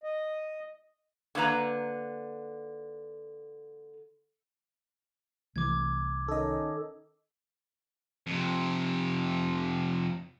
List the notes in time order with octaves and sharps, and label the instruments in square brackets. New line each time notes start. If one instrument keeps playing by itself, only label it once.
[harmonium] D#5
[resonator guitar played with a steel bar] D3 A#3 B4 A#5
[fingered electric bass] C2 E3 A3 [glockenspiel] D6 G#6
[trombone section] D#3 C#4 D#4 [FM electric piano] A4 D#5 [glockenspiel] E6
[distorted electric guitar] F2 C3